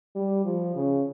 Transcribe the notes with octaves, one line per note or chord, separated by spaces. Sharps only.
G3
F3
C#3